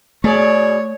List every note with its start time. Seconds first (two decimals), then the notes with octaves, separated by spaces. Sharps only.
0.24 B2 A3 G#4 C#5 D5